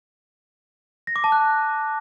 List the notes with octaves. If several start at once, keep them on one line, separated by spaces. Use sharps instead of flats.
A#6
D6
A5
F#6